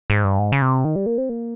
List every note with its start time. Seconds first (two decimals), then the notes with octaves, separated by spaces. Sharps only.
0.10 G#2
0.24 G2
0.39 G#2
0.52 C#3
0.62 C3
0.85 D#3
0.96 G3
1.06 A#3
1.18 C4
1.29 A#3